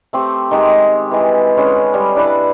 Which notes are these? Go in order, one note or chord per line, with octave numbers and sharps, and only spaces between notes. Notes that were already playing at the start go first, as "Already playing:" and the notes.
A3 C4 G4
D#3 G#3 G4
E3 G#3
D3 G#3 C#4 B4
G3
D4 E4 B4 D5